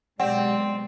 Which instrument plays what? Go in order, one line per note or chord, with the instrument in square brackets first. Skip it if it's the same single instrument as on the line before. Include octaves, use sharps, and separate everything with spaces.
[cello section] B2 F#3 G#3 [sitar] C4 [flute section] G4 D5 [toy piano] F#5